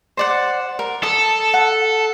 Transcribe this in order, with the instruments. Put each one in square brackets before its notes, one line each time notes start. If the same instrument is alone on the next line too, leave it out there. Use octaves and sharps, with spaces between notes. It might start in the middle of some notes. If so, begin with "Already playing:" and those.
[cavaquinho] C5 D5 F#5
A#4
[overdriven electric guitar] A4 [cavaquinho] D#6
[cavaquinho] F#5